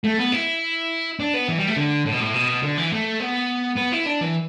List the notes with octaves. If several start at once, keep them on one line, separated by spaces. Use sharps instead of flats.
A3
B3
E4
D4
B3
E3
G3
A3
D3
A2
B2
A2
B2
D3
E3
A3
B3
B3
E4
D4
E3